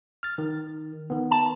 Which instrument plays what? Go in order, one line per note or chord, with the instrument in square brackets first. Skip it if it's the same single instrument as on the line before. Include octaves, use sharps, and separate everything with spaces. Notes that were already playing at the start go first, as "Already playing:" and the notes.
[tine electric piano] F6 A6
D#3
D#3 B3
[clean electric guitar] A5